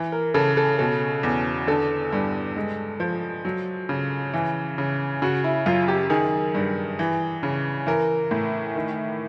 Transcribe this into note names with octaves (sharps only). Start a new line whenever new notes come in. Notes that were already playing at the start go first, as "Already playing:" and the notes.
Already playing: E3
A#4
C#3 A4
A4
B2 A4
E2
D3 A4
G2
G#3
F3
F#3
C#3
E3
C#3
C#3 F#4
E4
F#2 F4
G4
D#3 G#4
G2
E3
C#3
E3 A#4
A2
D#3